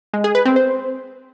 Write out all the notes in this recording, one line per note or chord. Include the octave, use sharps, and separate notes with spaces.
G#3
G#4
B4
C4
C5